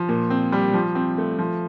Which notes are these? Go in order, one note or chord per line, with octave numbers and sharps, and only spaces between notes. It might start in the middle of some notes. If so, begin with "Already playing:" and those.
Already playing: F3
A#2
C4
G3
F3
C4
A3
F3